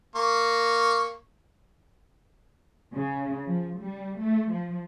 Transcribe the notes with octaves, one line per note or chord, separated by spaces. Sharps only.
A#3 C#6
C#3
F3
G3
A3
F3